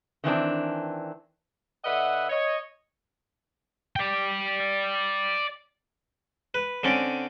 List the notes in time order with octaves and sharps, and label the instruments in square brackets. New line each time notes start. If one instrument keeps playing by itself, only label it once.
[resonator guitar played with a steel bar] D#3 E3 C4 D4
[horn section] D3 B4 D#5 E5 F#5
C#5 D#5
[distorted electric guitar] D5 G5
[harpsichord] B4
D3 C4 C#4 D5